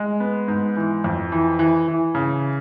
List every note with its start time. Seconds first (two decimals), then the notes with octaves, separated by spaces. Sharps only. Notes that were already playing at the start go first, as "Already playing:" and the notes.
Already playing: G#3
0.20 B3
0.48 G#2
0.77 E3
1.04 F2
1.32 E3
1.59 E3
1.88 E3
2.15 C#3